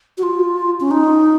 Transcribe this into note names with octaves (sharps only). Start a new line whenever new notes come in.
F#4
F4
C#4
D#4